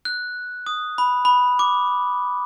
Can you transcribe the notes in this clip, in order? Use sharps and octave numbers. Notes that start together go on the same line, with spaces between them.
F#6
D#6
B5
B5
D6